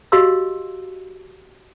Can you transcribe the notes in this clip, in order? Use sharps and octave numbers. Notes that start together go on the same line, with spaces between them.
F#4 G4 D#5 F5 C6 E6